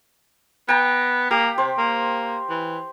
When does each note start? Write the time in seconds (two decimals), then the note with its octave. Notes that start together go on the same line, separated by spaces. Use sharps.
0.69 B3 G5 A#5
1.31 A#3 G4
1.58 C3 C5
1.78 A#3
2.49 E3